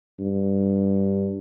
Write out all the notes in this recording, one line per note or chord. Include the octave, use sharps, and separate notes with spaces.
G2